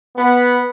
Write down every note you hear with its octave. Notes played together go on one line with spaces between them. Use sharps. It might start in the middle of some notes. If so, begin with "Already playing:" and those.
B3